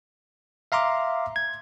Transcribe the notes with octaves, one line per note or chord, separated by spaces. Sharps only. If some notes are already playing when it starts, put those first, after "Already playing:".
E5 F5 A#5 C6 D6
G#6